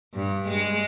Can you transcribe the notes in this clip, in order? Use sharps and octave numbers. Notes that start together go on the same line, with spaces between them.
G2
G#3